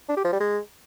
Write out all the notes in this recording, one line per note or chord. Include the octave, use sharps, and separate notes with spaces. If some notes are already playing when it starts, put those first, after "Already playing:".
D4
G4
F3
G3
G#3